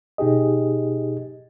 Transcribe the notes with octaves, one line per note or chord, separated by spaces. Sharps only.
B2 D#4 G4 G#4 D#5